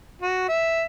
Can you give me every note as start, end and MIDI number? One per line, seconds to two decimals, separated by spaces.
0.21 0.47 66
0.48 0.83 76